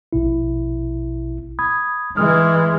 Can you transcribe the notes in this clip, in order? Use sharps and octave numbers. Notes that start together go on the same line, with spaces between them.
A#1 B2 E4
B5 D#6 G#6
E3 G#3 D#6 F6